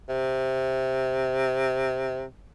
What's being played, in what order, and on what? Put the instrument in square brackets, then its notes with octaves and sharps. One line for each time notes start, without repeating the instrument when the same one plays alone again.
[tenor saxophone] C3